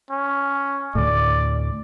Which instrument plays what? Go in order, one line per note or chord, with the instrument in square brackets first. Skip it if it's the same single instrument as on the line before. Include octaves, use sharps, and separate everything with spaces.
[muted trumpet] C#4
[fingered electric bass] D2 A2 [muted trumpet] D5